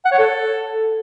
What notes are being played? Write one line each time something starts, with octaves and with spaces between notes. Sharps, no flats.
F#5
C#5
A4